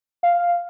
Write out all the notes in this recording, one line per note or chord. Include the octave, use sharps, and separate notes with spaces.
F5